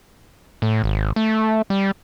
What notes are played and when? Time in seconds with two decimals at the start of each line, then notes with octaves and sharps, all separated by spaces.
0.62 A2
0.84 G#1
1.16 A3
1.70 G3